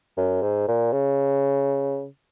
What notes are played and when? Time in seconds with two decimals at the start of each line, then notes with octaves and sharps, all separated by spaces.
0.17 F#2
0.42 G#2
0.68 A#2
0.92 C#3